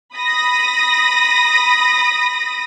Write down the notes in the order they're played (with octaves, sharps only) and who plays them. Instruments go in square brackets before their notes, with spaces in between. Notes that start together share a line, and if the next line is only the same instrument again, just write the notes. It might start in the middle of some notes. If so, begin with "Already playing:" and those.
[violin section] B5 D#6 A#6